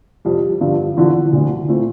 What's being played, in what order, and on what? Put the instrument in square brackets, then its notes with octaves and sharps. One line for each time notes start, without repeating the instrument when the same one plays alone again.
[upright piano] F2 C3 G3
G2 D3 F3
E2 D3 F3
D2 D3 A3
A#2 A3 C4 E4